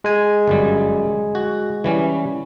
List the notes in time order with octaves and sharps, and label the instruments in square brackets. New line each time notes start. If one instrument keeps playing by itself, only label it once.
[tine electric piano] G#3 G#5
[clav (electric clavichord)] G1 F#2 G3
F#4
E3 G3 C#4